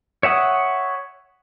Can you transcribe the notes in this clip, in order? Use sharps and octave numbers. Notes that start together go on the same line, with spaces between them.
C#5 E5 F#5 D#6